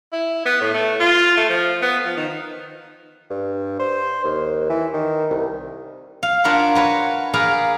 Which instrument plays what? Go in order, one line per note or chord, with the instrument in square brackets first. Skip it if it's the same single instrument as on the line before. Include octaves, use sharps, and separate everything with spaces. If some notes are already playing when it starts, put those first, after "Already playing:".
[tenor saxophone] E4
B3
A2
A3
F4
A3
F3
B3
F3
D#3
[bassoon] G2
C5
D#2
E3
D#3
C2
[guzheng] F5
D4 F4 A#4 C#5 F#5 B5
F#4 B4 C#5
G#4 A#4 B4 D5 F5 A#5